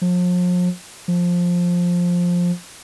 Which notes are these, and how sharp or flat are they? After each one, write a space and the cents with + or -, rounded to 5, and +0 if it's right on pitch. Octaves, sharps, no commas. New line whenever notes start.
F3 +40
F3 +10